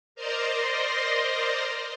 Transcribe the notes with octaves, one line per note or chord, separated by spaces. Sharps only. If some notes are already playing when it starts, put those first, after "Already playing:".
A#4 C5 D5 D#5 A#5 C6